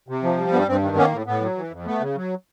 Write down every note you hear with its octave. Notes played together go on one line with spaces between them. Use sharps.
C3
F3
G3
G2 B3
G2 C4
D#3
A#3 B3 C#4
A2
A2 B3
F#3
E3
F2
A3 B3
C#3
F#3